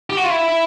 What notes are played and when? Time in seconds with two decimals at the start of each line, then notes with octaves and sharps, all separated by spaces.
0.10 G4
0.17 F#4
0.24 F4
0.30 E4